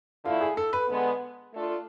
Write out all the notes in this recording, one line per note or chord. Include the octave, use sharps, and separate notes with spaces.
D3 A3 E4 F4
G#4
A4
B4
D3 G#3 B3
A3 D4 F4 A4